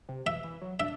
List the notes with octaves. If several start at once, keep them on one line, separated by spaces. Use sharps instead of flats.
C3
E3 E5
E3
F#3
D4 E5